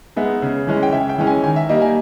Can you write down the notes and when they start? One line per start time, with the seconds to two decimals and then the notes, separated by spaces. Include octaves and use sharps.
0.16 G#3 B3 D#4 E5
0.42 C#3
0.67 E3 G#3 C#4
0.83 G5
0.92 C#3 E5
1.09 G5
1.18 E3 G#3 C#4
1.27 G#5
1.44 D#3 G#5
1.56 E5
1.69 G3 A#3 D#4 D#5
1.82 G#5